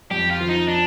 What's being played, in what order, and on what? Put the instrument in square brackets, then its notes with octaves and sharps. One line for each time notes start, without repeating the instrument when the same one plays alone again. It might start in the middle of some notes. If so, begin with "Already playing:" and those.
[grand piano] F2 [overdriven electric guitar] G4
[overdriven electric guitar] F4
[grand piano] F3
[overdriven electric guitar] D#4
D4